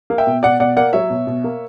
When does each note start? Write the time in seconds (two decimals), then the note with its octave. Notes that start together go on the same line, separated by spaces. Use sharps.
0.10 A#3
0.18 E5 G5
0.27 B2
0.43 B2 D5 F#5
0.60 B2 D5 F#5
0.77 A#3 D5 F#5
0.93 F#3 C#5 E5
1.10 B2
1.27 B2
1.44 A#3